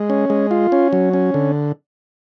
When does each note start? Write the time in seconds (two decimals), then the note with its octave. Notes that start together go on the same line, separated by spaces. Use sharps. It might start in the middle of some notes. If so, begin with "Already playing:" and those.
Already playing: G#3
0.10 C#4
0.30 G#3
0.51 F4
0.72 C#4
0.93 F#3
1.13 C#4
1.34 D3